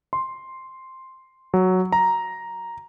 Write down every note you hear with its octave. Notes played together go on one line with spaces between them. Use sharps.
C6
F#3
A#5